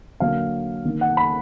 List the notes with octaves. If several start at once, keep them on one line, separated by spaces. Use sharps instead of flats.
D3 F#3 A#3 F5
D#3 A#3
F#5
B5